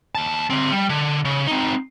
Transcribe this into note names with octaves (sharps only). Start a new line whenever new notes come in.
D#2 A5
D3 C4
G3
D3
C#3
C4 D#4